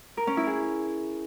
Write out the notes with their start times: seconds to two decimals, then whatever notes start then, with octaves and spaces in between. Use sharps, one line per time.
0.17 A#4
0.27 C#4
0.37 E4
0.47 G#4